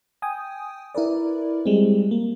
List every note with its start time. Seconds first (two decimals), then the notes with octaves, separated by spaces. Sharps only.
0.22 G5 G#5 D#6
0.95 E4 A#4 B4 D5
1.66 G3 G#3 C4
2.11 A#3